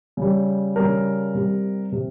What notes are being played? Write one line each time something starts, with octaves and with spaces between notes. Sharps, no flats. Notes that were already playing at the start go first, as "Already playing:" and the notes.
C#3 G3
C#3 G3 A#4
C3 G3
C3